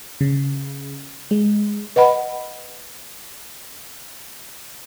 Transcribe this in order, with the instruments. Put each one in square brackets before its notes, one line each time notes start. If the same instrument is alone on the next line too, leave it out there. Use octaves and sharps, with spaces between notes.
[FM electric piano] C#3
G#3
[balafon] B4 D#5 F#5 B5